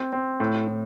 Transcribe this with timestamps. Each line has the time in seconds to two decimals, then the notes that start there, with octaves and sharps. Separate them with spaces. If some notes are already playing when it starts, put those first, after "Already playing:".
Already playing: C4
0.13 C4
0.40 A2
0.67 A2